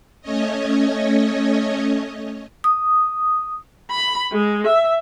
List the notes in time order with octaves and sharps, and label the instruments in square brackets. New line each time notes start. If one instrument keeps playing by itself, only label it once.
[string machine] A3 C#4 C#5 D#5
[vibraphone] D#6
[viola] B5
G#3
E5